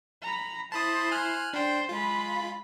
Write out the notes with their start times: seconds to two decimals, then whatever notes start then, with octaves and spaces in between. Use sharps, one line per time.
0.23 A#5 B5
0.72 E4 C5 A5 B5 D#6
1.11 G#5 F6 F#6
1.53 D4 C5 G5
1.89 G#3 F4 B5